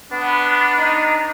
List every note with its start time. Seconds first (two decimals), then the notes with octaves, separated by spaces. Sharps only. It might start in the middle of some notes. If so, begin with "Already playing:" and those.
0.12 B3 D4
0.78 D#4